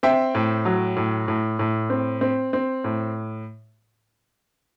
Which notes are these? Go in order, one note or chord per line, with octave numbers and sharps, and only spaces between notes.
C4 E5 G5
A2
F#3
A2
A2
A2
C4
C4
C4
A2